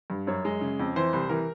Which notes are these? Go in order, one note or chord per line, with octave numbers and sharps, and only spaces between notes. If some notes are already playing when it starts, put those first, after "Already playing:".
G2
F#2 C#5
G#3
C#3
F2
E3 C5
C2
E3 A#4